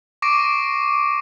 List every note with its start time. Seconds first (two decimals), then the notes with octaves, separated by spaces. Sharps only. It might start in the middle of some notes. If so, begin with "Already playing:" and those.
0.22 C#6 D6 A#6 C7 D7 D#7